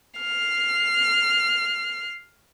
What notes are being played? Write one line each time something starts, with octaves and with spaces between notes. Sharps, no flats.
F6 C7